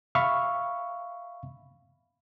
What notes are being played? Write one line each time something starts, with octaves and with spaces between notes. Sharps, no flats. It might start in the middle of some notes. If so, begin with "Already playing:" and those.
E5 F5 B5 C#6